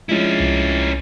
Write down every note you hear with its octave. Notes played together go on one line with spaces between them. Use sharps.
F3 G#3 C#4 D4 E4
C2